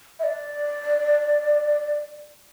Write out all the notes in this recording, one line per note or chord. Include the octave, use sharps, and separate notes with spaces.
E5
D5